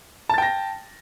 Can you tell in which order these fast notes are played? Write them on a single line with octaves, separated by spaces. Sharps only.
A5 A6 G5 A#6